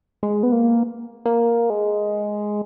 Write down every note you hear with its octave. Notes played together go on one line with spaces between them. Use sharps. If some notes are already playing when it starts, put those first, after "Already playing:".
G#3
B3
A#3
A#3
G#3